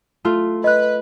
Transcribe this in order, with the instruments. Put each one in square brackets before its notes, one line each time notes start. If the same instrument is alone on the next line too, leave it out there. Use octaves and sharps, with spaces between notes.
[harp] A3 F4
[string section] B4 [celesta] D#5 F#6